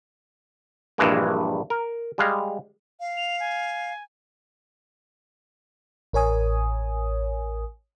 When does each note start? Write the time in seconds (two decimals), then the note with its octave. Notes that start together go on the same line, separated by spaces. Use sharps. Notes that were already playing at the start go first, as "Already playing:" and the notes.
0.98 A#1 G2 E3 G#3 A#3
1.70 A#4
2.18 G3 G#3 F5
3.00 F5
3.17 F7
3.40 G#5
6.13 A1 A#4 C#5 G#5 D#6